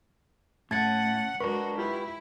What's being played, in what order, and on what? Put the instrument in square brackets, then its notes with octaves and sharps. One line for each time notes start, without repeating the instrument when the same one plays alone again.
[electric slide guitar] A2 [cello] C#4 F#5 [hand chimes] A5 G#6 A6
[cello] G#3 F#4 [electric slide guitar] D4 A#4 B4 [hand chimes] C#6
[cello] E4 [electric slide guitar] F4 G4 B4